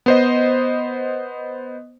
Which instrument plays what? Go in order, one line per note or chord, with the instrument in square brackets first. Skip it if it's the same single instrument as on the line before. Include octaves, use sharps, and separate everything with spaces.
[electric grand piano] B3 C5 D#5